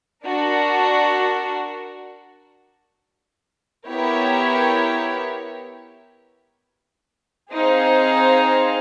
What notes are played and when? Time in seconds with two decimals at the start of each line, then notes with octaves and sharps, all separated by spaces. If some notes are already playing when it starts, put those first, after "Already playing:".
0.24 D4 F#4 A#4
3.88 B3 E4 G4 A#4 C#5
7.53 C4 D#4 G#4 C5 F5